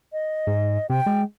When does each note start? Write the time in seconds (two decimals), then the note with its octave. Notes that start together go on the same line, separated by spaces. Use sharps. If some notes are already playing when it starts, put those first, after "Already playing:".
0.13 D#5
0.47 G#2
0.90 C3 G5
1.06 G#3